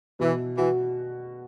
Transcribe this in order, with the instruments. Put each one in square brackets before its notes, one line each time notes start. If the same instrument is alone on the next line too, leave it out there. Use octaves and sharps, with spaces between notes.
[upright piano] B2 [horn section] E3
[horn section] E3 [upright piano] F#4